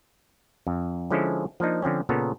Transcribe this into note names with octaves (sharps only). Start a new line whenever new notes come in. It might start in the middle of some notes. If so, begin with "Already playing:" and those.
F2
D3 F3 G#3 C#4 E4 A4
F3 A#3 D4 D#4
D3 F3 C4 C#4
A#2 C#3 B3 A4 A#5